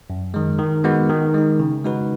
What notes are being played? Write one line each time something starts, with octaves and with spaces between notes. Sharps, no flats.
F#2
D#3 G#3
D#3
G#3 B3 F#4 B4
D#3
G#3 D#4
C#3
G#3 D#4 F#4 B4